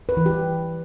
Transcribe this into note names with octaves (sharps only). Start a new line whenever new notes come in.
B4
E3
G4